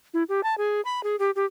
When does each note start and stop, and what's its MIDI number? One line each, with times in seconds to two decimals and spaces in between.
0.14 0.23 64
0.29 0.41 67
0.43 0.55 81
0.58 0.81 68
0.85 1.03 83
1.03 1.16 68
1.19 1.31 67
1.36 1.45 67